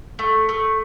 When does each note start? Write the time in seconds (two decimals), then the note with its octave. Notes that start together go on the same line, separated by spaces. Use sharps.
0.19 A3
0.49 A3